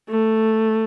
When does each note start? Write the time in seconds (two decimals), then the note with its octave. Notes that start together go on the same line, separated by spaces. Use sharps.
0.09 A3